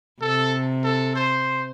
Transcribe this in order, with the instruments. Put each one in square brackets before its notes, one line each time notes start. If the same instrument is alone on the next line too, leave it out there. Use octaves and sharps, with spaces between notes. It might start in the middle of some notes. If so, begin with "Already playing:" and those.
[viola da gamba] C3 [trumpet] A4
[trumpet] A4
C5